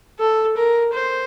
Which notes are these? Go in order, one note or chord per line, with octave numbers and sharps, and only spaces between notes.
A4
A#4
C5